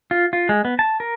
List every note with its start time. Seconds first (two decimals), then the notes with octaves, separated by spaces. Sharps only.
0.11 F4
0.33 F4
0.49 G#3
0.65 B3
0.79 A5
1.00 A#4